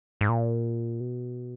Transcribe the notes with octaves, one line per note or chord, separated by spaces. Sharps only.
G#2
A#2
B2